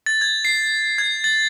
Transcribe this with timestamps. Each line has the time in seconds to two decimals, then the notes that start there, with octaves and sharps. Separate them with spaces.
0.06 A6
0.21 G#6
0.45 C7
0.98 G#6
1.24 A6